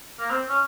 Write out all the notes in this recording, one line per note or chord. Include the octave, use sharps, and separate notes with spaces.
A#3
C4
C#4